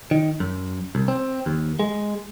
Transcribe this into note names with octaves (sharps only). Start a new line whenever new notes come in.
D#3
F#2
C2
C4
D#2
G#3